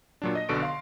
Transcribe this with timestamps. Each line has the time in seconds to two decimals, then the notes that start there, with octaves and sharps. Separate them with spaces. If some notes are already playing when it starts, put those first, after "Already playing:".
0.22 A#2 F#3 D4
0.35 D#5 A#6
0.49 B1 B2 D3 A4 C#6 D7
0.62 F5 C6